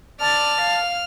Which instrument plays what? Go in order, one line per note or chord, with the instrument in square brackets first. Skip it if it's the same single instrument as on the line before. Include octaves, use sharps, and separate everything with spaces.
[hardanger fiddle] D5 [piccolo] A5 [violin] F6
[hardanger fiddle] F5